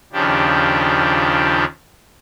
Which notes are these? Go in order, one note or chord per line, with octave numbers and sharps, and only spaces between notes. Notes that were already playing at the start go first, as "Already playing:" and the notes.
D#2 C#3 F3 D4 G4